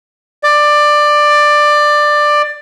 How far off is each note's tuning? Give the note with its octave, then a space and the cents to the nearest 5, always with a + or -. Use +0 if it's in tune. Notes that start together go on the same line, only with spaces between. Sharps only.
D5 +15